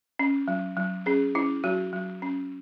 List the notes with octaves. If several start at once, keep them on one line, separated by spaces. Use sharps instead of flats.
C#4
F#3
F#3
C#4 G#4
C#4 E4
F#3 F#4
F#3
C#4